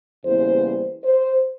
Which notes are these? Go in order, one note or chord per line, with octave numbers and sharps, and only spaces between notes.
E2 C#3 E3 G3 A#3 C5
C5